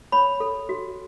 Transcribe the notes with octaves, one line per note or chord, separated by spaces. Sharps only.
C#5 B5
A4
F#4